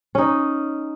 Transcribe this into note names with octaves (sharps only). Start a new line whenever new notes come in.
C#4 D#4